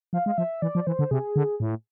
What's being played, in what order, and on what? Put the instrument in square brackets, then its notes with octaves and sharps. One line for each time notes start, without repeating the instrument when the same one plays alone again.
[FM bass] F3 [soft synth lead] F5
[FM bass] G#3 [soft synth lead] F5
[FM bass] F3 [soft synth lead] E5
[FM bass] E3 [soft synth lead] D5
[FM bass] F3
[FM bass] E3 [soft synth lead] C5
[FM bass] D3
[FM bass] C3 [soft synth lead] G#4
[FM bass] D3
A2